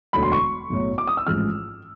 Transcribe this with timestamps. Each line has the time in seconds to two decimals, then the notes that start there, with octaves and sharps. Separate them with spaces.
0.13 E1 D2 D3 F#3 B5
0.23 C6
0.32 C#6
0.70 B1 A2 F#3
0.98 D6
1.07 D#6
1.17 E6
1.27 A1 G#2 F3 G#3 F6